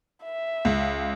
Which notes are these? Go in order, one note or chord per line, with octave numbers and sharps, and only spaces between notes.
E5
C#2